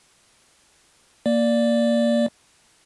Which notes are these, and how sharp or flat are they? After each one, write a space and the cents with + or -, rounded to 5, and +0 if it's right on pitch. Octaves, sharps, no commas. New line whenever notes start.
A#3 +0 D5 +0